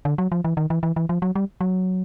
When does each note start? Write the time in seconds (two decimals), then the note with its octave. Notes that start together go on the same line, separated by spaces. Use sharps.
0.05 D3
0.18 F#3
0.32 F3
0.44 E3
0.57 D#3
0.70 E3
0.83 E3
0.96 E3
1.09 F3
1.22 F#3
1.35 G3
1.61 F#3